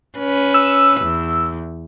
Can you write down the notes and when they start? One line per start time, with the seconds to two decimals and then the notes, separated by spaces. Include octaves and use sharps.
0.19 C#4 B4
0.54 E6
1.01 E2